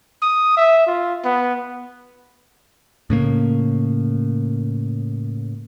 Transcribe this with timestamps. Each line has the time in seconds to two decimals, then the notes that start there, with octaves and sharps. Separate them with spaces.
0.22 D#6
0.57 E5
0.87 F4
1.25 B3
3.10 A2 C#3 A#3